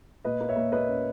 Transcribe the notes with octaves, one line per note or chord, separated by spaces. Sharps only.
A#2 B4 D#5
A#3
C#5 E5
A#3
A#3 B4 D#5
C#4